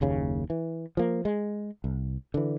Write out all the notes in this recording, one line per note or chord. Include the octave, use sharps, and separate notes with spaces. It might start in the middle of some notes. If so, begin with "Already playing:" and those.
F#1 D#2 C#3
E3
F3 A#3
G#3
C2
D3 E3